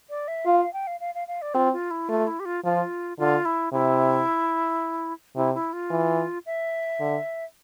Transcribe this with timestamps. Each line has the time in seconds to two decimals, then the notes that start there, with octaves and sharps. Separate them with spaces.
0.10 D5
0.28 E5
0.46 F4 F5
0.60 F5
0.73 G5
0.87 F5
1.00 F5
1.15 F5
1.28 F5
1.42 D5
1.54 C4 F4
1.73 F4
1.91 E4
2.09 A3 F4
2.27 E4
2.40 G4
2.45 F4
2.64 F3 F4
3.18 D3 F4
3.45 E4
3.73 C3 E4
5.36 C3 E4
5.55 E4
5.73 F4
5.91 E3
6.46 E5
7.00 D3